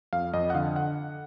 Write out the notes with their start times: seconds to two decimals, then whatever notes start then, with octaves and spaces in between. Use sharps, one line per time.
0.13 F2 F5
0.34 F2 D#5
0.50 F#5
0.55 D3 F5
0.76 F#5